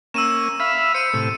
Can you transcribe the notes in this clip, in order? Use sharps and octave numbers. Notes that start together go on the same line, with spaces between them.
A#3 C#4 E6 D#7 E7
E5 F5 B5
C5 C#7 D#7
A2 C3